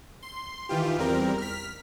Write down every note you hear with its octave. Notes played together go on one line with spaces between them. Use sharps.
C6
D#3 E3 F4 G4
E2 G3 C4 A#4
F6 B6